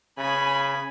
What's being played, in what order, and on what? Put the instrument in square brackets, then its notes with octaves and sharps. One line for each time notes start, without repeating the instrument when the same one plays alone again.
[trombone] C#3 [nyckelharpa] G#5 B5